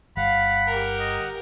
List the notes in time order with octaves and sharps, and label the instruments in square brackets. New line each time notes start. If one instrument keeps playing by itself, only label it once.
[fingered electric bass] G1 G3 [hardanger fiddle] F5 [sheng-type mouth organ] F#5 [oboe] B5
[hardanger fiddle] G4 A#4
[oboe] D#5